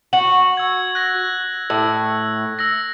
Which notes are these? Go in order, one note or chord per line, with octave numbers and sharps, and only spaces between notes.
F#4 F#7
E6 G#6
F#6 A#6
A2 E6
E6 A#6